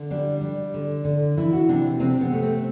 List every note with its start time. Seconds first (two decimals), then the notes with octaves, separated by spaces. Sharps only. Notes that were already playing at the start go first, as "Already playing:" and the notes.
Already playing: D3
0.10 G3 D4
0.41 G3
0.74 D3
1.05 D3
1.37 E3 E4
1.52 F#4
1.69 C3 D4
2.00 C3 C4
2.21 B3
2.33 A3
2.42 C4